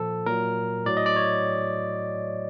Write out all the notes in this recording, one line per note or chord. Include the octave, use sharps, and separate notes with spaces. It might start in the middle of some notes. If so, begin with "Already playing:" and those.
Already playing: A#2 F3 A4
A#2 F#3 A#4
A2 F#3 D5
D#5
D5
C#5